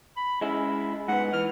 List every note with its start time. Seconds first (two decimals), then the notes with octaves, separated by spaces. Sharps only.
0.17 B5
0.41 G#3 C#4 E4
1.09 G#2 B3 F#5
1.33 E3 F6